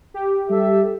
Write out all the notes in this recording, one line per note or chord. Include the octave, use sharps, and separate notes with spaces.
G4
G3 A4 E5